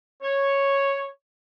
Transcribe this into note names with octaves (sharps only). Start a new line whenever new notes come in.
C#5